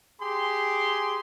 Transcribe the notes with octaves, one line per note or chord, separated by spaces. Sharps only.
G4 G#4 C6